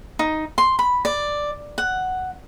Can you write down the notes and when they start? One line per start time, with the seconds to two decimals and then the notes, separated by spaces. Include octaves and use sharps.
0.19 D#4
0.58 C6
0.79 B5
1.05 D5
1.78 F#5